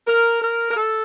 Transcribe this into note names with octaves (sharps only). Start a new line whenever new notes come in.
A#4
A#4
A#4
A4